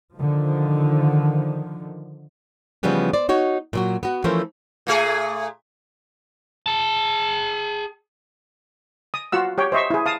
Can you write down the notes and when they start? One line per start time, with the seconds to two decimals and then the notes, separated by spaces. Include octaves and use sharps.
0.15 D3 D#3 F3
2.83 C#3 E3 F3 G3 B3 C#4
3.13 C5 D5
3.29 D#4 F#4 C#5
3.73 A#2 F#3 F#4
4.03 B3 F#4
4.24 E3 F3 A3 C#4 A#4 C5
4.87 A#2 A3 G#4
6.66 G#4 A5
9.14 D#6
9.32 F4 F#4 F#5 E6
9.58 G4 C#5 G5
9.72 C5 D#5 E5 C#6
9.90 E4 G#4
10.06 F5 A5 D#6